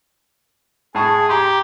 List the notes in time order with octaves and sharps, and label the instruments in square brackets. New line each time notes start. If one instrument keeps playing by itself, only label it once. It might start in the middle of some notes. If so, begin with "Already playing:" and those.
[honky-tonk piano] A2 A5 C#6 [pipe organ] G#4
[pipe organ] G4 [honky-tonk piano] A#5 C6